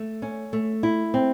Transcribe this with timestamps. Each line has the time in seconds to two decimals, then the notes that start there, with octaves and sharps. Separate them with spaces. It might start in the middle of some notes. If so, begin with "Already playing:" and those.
Already playing: A3
0.22 C#4
0.53 A3
0.83 E4
1.14 C4